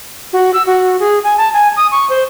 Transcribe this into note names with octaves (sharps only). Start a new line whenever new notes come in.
F#4
E6
F#4
G#4
G#5
A5
G#5
D#6
C#6
C5